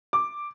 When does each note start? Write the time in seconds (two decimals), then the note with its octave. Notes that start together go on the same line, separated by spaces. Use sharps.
0.13 D6